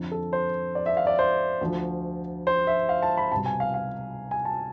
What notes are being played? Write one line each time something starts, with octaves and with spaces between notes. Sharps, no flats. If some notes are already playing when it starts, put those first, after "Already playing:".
Already playing: F2 D3 F3
A4
C5
D5
E5
F5
D5
C5
D2 D3 F3
C5
E5
F5
A5
B5
C2 B2 A5
G#5
F5
F5
G#5
A5